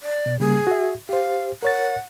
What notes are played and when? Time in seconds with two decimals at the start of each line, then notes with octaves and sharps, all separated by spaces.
0.02 D5
0.26 B2
0.40 C#3 G3 A#3 G#4
0.67 F#4 E5
1.09 G4 C5 F5
1.63 A#4 C#5 F#5 A6